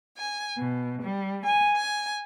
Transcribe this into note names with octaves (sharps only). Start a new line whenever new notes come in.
G#5
B2
G3
G#5
G#5